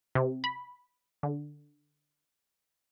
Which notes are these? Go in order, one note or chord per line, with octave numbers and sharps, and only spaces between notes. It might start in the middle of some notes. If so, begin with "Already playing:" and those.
C3
B5
D3